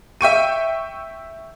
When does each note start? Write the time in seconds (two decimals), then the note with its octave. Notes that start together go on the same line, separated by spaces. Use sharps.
0.21 E5 G5 C#6 D#7